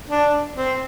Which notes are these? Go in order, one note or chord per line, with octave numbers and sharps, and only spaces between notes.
D4
C4